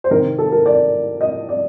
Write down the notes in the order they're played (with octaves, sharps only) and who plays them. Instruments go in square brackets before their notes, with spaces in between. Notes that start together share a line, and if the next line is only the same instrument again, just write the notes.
[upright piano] C5
D#3 A#4
C3
A4
A#4
D5
D#5
D5